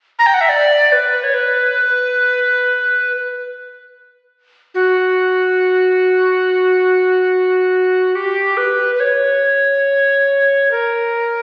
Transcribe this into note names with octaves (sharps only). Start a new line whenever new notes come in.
A#5
G5
F#5
E5
D5
B4
C#5
B4
F#4
G4
B4
B4
C#5
A#4